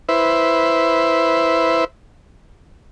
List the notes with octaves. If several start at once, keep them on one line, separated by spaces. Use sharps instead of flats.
E4 B4 C5 E5